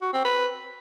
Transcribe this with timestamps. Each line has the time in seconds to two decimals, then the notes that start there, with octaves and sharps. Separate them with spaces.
0.02 F#4
0.13 C4
0.24 B4